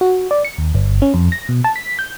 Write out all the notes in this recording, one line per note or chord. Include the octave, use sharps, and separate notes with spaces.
F#4
D5
C#7
D#2
G1
C#4
F2
A#6
B2
A5
B6
G6